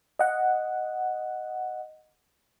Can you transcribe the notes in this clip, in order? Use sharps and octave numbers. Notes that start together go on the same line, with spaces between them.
D#5 F#5